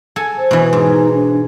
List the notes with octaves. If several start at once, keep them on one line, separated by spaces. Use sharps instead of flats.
A4 G#5
C5
B2 E3
G#2 D#4
D4